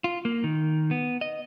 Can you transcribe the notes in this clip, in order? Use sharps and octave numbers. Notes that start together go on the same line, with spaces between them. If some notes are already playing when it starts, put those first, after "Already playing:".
F4
A#3
D#3
B3
D#5